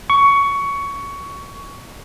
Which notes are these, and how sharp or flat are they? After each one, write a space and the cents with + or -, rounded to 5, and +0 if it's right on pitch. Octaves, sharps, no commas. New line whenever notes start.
C#6 +15